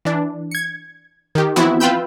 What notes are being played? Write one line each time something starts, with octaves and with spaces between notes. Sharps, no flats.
E3 D4
G#6 C#7
D#3 G4
E3 F3 B3 C4 E4 F#4
F4 B4 G5 B5 E6 G6